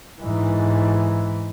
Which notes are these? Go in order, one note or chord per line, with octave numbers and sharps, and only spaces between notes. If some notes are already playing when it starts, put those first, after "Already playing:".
G#2 E3